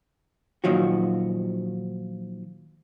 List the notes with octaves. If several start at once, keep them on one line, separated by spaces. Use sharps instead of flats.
A#2 D#3 F3 F#3 F#4